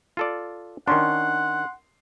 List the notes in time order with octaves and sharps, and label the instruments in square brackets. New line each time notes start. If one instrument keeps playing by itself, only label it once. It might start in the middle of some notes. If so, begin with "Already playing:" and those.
[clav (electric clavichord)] F4 A4 D5
[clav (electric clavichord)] D#3 C#4 D4 [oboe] F#5 [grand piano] C6